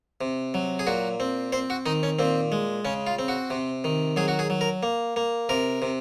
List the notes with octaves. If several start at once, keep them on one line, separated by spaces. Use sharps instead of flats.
C3
F#3
G#4
A#2 F#4
C4
C4 C5
F#4
D#3 D#4
C#4
A#2 C4
G#3
C#3 C#4
F4
C4
F#4
C3
D#3
F#3 G#4
F#4
G#4
F#3
A#4
A#3
A#3
C3 A#4
C3